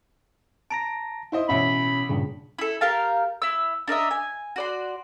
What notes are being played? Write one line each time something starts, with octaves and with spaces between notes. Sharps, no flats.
A5 A#5 A#6 D7
E4 C5 D#5
A1 B2 C#4 E5 B5
G2 A#2 C#3
E4 A4
G4 A#4 F5 A5
E4 E6
D4 A#4 D#5 E5
G#5
F#4 D5 C6